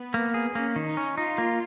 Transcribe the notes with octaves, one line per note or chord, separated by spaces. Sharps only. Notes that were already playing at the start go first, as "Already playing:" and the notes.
Already playing: B3
A#3
G#4
A#3 C#4
D#3
D#4
C#4
D#4 F4
A#3